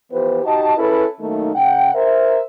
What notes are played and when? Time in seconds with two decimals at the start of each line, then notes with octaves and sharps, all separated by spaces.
0.11 E3 F3 B3 G4 B4 C5
0.44 D#4 F#4 G4 D#5 A5
0.77 C#4 E4 G#4 A4 B4
1.20 F#2 D#3 A3 A#3 D#4
1.55 C#3 F#5 G5
1.95 A#4 C5 E5